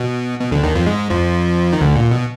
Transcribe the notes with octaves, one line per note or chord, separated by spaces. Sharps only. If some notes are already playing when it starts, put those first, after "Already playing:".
Already playing: B2
B2
D2 D3
D#2 D#3
F2 F3
G#2 G#3
F2 F3
D#3
D2 D3
A#2
B2